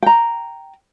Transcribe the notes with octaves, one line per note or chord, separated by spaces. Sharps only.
G5 A#5